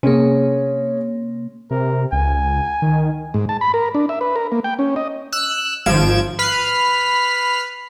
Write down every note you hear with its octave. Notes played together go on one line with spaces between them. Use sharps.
C3 A#3 C#4 G#4
C3 A#4
C#2 G#5
D#3
G#2
A5
B5
A#4
D4
E5
B4
A#4
A#3
G5
C#4
D#5
E6 F#6
G#1 F3 G#6 D7 E7
B4 B5 F6 C7